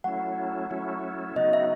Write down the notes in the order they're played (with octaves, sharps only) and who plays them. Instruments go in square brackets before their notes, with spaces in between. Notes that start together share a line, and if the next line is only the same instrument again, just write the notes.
[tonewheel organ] F#3 A3 C#4 E4 [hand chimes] F#5
[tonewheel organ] F#3 A3 C#4 E4
[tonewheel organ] C#3 F#3 B3 D#4 F#4 [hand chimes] D#5
[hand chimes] E5